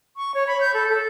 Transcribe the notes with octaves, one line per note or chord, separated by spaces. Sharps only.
C#6
C#5
B5
G6
A4
A4